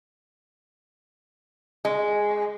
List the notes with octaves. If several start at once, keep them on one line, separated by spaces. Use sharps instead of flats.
G#3